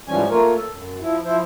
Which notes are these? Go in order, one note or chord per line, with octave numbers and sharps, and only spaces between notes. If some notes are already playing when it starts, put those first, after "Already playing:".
G#2 E3 F3 G3 C#4 G#5
A3 A#3 F4 A#4 C#5
A4
F#2
F3 E4
F3 E4 C5